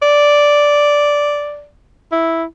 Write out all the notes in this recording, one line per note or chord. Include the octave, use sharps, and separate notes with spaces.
D5
E4